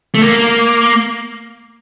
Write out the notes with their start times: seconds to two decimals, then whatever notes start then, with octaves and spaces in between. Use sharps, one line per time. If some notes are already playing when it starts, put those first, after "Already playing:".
0.15 A3
0.22 A#3